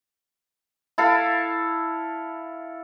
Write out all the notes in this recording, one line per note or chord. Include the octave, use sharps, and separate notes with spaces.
E4 A4 F5